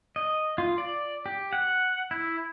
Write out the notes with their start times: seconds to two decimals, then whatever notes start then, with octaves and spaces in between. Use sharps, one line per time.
0.16 D#5
0.58 F4
0.78 D5
1.26 G4
1.53 F#5
2.11 E4